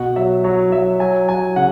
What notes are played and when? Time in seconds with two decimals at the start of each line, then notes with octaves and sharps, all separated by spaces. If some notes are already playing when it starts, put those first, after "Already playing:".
Already playing: B2 F#5
0.16 F#3 E5
0.44 F#3 C#5
0.72 F#3 E5
1.00 F#3 G#5
1.28 F#3 G#5
1.56 C#3 F#5